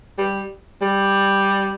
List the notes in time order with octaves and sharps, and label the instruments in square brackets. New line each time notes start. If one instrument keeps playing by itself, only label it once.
[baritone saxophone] G3
G3